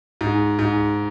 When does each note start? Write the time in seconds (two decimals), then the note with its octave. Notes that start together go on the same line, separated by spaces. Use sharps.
0.21 G#2
0.59 G#2